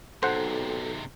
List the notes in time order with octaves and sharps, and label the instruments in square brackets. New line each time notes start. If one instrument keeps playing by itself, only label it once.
[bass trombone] B1 [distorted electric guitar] G#2 C3 [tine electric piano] A4 [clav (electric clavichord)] C5 F#5